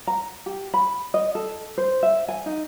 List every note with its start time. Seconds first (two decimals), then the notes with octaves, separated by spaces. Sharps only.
0.07 A#5
0.46 G4
0.74 B5
1.14 D#5
1.35 A4
1.78 C5
2.03 E5
2.28 G#5
2.46 D#4